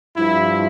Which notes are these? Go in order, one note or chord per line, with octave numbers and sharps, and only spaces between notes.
G2 F3 E4